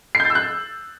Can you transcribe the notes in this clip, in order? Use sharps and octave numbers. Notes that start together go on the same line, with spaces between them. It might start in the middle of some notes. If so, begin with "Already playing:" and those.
C7
G6
A6
E6
F#6